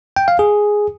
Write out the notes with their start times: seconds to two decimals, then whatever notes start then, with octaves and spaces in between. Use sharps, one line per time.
0.16 G5
0.28 F5
0.39 G#4